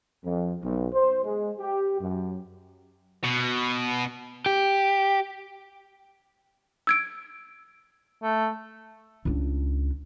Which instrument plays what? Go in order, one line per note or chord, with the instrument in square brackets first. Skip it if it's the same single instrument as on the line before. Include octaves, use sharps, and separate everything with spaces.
[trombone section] F2
B1
C5
G#3
G4
F#2
[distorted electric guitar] B2
[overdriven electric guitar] G4
[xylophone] E6 G#6 D7
[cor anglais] A3
[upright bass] C#2 D4